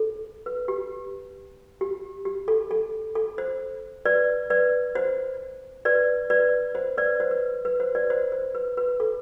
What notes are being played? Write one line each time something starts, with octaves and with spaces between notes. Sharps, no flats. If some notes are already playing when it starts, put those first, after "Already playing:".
Already playing: A4
B4
G4
G4
G4
A4
A4
A4
C5
B4 D5
B4 D5
C5
B4 D5
B4 D5
C5
B4 D5
C5
B4
B4
C5
B4 D5
C5
C5
B4
B4
A4